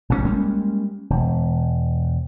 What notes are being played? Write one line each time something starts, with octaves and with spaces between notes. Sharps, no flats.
A#1 G#2 B2 C#4
G3 G#3 A#3 C#4
E1